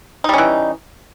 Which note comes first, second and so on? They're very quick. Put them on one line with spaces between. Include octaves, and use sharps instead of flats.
D#4 G3 C#4 E3